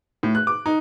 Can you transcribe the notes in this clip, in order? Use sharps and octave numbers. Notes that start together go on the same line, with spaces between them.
A2
F#6
D6
D#4